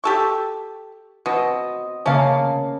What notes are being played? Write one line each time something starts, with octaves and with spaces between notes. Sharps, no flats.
G4 A4 C#6
B2 C4 D#5
C#3 A#3 C#4 F5 A5